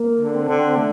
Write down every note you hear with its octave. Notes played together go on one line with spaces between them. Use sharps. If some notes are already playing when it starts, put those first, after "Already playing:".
Already playing: A#3
D3
C4
D3
D3 A3